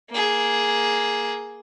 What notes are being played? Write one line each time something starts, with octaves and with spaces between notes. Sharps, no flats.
A#3 G#4